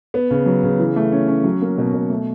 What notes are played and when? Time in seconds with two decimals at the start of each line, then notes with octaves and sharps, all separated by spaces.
0.14 B3
0.30 C#3
0.46 F#3
0.63 C#3
0.79 E3
0.96 A3
1.12 C#4
1.28 C#4
1.44 F#3
1.62 A#3
1.78 B2
1.94 B2
2.10 A3